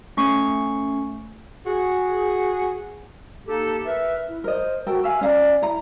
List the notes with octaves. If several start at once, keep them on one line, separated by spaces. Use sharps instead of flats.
A3 C#4 C#6 C7
F#4 G#4
A#3 D#4 G4 A4
A#4 B4 E5
E4
A#4 C5 D#5
F#4 A4 A#4 G5
E5 F5 G#5
C#4 D5 F5 A#5
E4 A#5